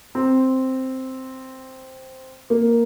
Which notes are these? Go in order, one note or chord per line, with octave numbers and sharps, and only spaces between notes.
C4
A#3